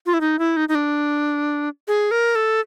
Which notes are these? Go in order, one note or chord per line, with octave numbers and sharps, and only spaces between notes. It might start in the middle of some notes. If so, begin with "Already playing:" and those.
F4
E4
D#4
E4
D#4
D#4
D4
G#4
A#4
A4